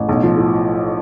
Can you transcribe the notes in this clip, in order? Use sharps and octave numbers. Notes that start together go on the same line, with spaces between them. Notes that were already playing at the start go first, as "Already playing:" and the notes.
Already playing: A1
B1
F3
A2